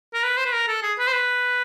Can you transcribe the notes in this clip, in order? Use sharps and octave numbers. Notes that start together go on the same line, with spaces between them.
A#4
B4
C5
B4
A#4
A4
G#4
B4
C5
B4